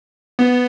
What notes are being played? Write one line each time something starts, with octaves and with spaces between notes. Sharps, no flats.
B3